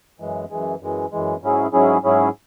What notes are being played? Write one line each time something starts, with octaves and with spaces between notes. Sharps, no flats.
F#2 E3 G#3
F#2 E3 G#3
F#2 E3 G#3
F#2 E3 G#3
G#2 F#3 C#4 E4 G#4
G#2 F#3 C#4 E4 G#4
G#2 F#3 C#4 E4 G#4